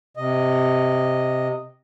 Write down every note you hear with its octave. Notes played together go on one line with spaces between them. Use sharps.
C3 D#5